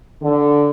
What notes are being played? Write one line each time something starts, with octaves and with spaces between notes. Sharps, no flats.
D3